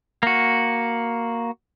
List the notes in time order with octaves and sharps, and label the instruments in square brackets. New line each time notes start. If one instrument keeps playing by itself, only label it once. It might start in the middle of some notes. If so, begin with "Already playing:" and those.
[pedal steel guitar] A#3 F#4